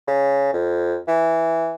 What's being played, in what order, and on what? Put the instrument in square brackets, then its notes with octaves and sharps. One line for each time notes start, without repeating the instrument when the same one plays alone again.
[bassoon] C#3
F2
E3